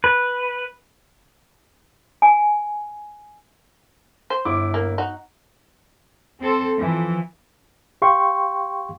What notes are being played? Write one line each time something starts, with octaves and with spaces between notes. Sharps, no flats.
B4
G#5
C5
G1 E4 D6
A#3
D#4 F#4
C4 A4 C5
E3 F3
G4 F5 G5 C6 C#6